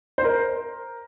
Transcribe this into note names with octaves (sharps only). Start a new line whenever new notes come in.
C5
A#4